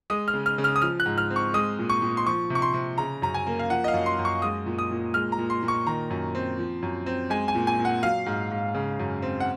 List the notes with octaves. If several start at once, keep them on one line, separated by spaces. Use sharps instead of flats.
G#3 D#6
F6
C#3
F6
C#3
F6
D#6
F3 F6
F#6
G#2
F6
C4
C#6
G#3 D#6
A#2
C#6
A#2
C6
F3 C#6
C3
C#6
C6
C3
C#3 A#5
F#2 A#5
G#5
A#3
F5
F3 F#5
D#5
F5
F#2
C6
F#2
C#6
G#3 D#6
A#2
D#6
A#2
G#3 F6
A#5
A#2
C6
A#2
C#6
D#3 A#5
F#2
C4
F3
F#2
C4
G#3 G#5
G#5
A#2
G#5
A#2
F#5
F#3 F5
G#2
G#2
C#3
F#2
C4
F#5